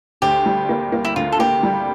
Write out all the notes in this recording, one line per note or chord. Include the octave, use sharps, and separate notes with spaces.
D2 G4
G3
A#3
A#3
E4
D2 F4
A4
A#3 G4
G3